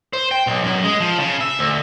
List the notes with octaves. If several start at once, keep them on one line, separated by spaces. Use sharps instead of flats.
C5
G5
B1
F#2
G#3
F3
C#3
E5
D2